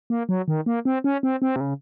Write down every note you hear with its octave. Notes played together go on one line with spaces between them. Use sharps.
A#3
F#3
D#3
A#3
C4
C#4
C4
C4
C3
C#3